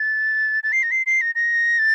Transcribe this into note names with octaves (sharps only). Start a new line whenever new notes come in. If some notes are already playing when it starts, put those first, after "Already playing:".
Already playing: A6
A6
C7
A#6
C7
C7
A#6
A#6
A6